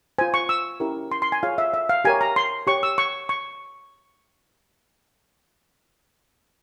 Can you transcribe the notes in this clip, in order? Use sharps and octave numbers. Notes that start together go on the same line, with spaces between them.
F4 C5 G#5
C#6
E6
C#4 E4 G4 A#4
C6
C6
G#5
F4 G#4 C#5 F5
E5
E5
F5
G4 A#4 C#5 G#5
A#5
C6
G4 C#5 C#6
E6
C#6
C#6